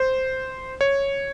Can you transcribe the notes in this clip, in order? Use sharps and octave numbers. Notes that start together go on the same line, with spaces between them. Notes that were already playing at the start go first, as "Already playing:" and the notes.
Already playing: C5
C#5